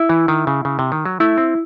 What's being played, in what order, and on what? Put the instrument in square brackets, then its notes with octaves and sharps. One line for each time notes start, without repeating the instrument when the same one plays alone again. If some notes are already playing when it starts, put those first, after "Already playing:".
Already playing: [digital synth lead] E4
[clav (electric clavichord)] E3
D#3
C#3
C#3
C3
D#3
F#3
[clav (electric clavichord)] A3 [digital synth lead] E4
[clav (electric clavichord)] C4